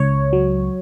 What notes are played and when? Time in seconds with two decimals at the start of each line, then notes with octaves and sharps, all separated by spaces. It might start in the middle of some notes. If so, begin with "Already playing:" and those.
Already playing: C#2 C#5
0.33 F#3